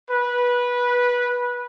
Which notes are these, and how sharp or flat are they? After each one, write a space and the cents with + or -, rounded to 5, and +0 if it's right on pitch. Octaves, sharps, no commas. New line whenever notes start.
B4 -15